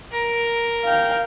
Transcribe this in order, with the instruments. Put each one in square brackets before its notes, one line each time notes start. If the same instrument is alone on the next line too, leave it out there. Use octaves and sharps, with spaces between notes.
[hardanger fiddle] A#4
[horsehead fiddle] F5 G5